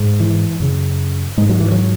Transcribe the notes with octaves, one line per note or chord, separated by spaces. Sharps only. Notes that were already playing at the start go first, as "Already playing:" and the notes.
Already playing: G#2
E3
F#2 C#3
G#2 G#3
F#3
E3
F#3